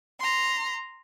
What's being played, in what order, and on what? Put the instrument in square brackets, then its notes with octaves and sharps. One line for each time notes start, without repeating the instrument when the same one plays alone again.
[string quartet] A#5 C6